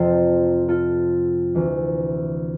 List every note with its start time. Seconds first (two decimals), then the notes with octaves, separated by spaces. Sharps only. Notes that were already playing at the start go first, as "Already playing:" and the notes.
Already playing: F2 C3 F3 A4 C5
0.69 F4 A4
1.55 D2 C3 E3